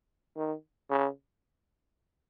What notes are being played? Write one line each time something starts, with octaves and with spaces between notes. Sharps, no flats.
D#3
C#3